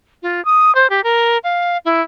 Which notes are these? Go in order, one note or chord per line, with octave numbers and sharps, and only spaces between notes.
F4
D#6
C5
G4
A#4
F5
E4